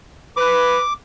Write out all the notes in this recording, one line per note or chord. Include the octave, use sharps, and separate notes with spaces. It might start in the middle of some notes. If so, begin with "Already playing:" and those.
B4 D6